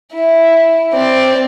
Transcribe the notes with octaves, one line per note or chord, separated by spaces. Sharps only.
E4
C4 D5